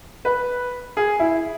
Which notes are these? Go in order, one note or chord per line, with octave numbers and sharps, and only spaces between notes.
B4
G#4
E4